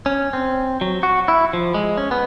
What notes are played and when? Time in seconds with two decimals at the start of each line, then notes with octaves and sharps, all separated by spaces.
0.06 C#4
0.33 C4
0.81 F#3
1.03 F#4
1.28 E4
1.53 F3
1.74 G#3
1.98 C#4
2.11 B3